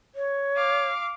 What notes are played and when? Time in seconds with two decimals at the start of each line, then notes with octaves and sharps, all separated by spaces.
0.15 C#5
0.56 F5 D6